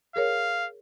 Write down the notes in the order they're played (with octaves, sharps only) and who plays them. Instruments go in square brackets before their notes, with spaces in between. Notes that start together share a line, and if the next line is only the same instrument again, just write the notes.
[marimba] G#4 A#4 C#5 [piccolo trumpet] F5